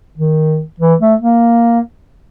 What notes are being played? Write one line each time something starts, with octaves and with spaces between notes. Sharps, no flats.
D#3
E3
A3
A#3